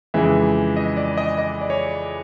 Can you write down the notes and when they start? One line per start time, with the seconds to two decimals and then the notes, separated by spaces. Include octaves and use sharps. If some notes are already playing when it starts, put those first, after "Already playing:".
0.14 F2 C#3 E3 G#3 E5
0.76 D#5
0.97 D5
1.17 D#5
1.38 D#5
1.61 D5
1.70 C#5